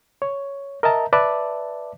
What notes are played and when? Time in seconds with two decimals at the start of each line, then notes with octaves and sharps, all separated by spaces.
0.22 C#5
0.83 A#4 D#5 E5 A5 A#5
1.13 B4 D5 E5 A5 D6